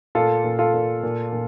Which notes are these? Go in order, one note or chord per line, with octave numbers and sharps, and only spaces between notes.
A#2 F4 A4
A#2
F4 A4
A#2
A#2
A#2